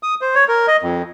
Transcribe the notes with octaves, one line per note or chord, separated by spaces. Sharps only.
D#6
C5
C#5
A#4
D#5
F2